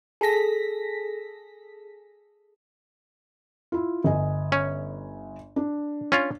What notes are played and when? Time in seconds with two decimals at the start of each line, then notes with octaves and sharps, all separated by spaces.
0.21 G#4 A4 A#6 B6
3.72 E4 F4
4.04 G1 D#5 G#5
4.52 C#4
5.56 D4
6.12 C#4 F4